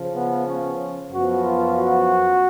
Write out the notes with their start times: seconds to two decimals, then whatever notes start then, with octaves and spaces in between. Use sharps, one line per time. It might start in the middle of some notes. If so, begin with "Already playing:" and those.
Already playing: C#3 F3
0.16 B3
0.49 C#4
1.12 F#2 F3 B3 F#4
1.45 F4
1.77 F#4